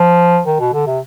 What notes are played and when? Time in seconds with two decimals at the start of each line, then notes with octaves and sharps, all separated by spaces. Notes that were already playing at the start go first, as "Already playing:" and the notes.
Already playing: F3
0.46 D#3
0.60 B2
0.73 D3
0.87 C3